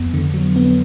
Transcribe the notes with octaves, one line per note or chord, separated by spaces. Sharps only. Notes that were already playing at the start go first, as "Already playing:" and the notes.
Already playing: F2 B3
D3
F#3
B3